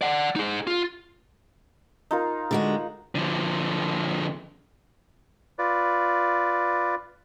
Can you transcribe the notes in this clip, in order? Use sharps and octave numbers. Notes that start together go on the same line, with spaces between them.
D5 F#5
D#4 G#4
F4
D#4 F4 A#4
D3 G#3 F#4
D3 F3
F4 B4 D5